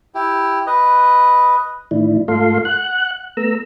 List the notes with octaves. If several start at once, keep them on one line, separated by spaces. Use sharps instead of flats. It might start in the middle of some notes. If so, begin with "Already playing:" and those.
E4 G4
B4 D#5
A2 D#3 E3 D4 E4
G#2 A3 F4 A4 F5 C6
F#5 F#6
A3 B3 A#5 E6